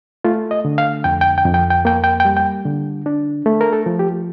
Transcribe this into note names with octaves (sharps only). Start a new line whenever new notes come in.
A3 F4
D#5
D3
F5
F2 G5
G5
G5
F2
G5
G5
A#3 G5
G5
G5
G3
G5
D3
D4
A3
A#4
A4
F3
G4